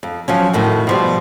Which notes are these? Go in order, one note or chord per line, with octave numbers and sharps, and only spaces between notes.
F2
F3 F#3 C#4
F2 A2 D#3 F#4
B2 F3 G3